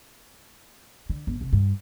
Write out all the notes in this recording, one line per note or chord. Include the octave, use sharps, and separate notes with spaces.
D3
G1
F1
G2